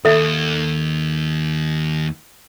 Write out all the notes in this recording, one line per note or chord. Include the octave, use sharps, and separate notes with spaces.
D#2 A4 E5